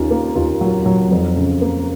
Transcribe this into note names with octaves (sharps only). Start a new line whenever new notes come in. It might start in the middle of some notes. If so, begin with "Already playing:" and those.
Already playing: D#2 C#3 F4
A#3
D#2 F4
F#3
F#3
F2
C#3
A#3